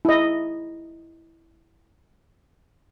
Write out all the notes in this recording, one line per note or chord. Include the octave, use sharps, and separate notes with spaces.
E4 D#5